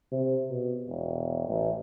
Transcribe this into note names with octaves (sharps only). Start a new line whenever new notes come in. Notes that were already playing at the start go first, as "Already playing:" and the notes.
C3
B2
E1
A1